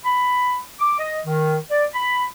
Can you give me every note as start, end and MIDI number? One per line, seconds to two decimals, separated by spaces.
0.04 0.57 83
0.80 0.95 86
0.98 1.17 75
1.26 1.55 51
1.69 1.85 74
1.93 2.24 83